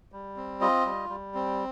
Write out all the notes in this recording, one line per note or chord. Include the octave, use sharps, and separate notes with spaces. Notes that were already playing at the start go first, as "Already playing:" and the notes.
G3
C4
F4 D#5
G3
G3
C4